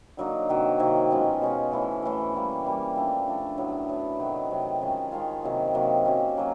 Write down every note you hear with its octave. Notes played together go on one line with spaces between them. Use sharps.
D3 F#3 A#3 D#4
C3 D#3 F#3 A#3
C3 D#3 F#3 A#3
B2 G#3 C#4 F4
B2 G#3 C#4 F4
A2 E3 A3
A2 E3 A3
E3 G3 A#3
E3 G3 A#3
F3 A3 D4
F3 A3 D4
A2 F#3 B3
A2 F#3 B3
C3 D#3 F#3 A3
C3 D#3 F#3 A3
D#3 G#3 C#4 F4
D#3 G#3 C#4 F4
C3 D#3 F#3 A#3
C3 D#3 F#3 A#3
F#3 A#3 C#4
F#3 A#3 C#4